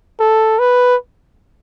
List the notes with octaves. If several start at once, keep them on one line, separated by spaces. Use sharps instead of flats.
A4
B4